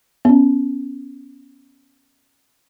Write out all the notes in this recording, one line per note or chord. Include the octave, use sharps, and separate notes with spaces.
B3 C#4